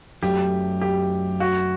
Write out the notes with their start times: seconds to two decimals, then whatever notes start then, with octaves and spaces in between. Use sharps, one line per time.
0.22 F#2 F#3 A3 G4
0.81 G4
1.40 F#4